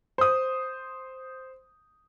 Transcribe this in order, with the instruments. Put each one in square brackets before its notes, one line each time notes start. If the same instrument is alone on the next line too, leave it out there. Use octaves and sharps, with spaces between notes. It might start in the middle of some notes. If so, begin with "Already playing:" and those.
[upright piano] C5 D#6